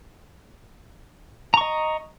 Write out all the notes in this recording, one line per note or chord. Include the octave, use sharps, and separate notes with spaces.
D#5 A#5 C#6